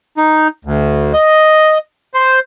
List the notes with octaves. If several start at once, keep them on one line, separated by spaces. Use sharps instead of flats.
D#4
D2
D#5
C5